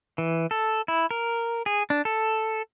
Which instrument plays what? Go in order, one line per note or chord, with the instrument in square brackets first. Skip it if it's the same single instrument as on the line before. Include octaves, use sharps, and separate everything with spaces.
[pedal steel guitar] E3
A4
E4
A#4
G#4
D4
A4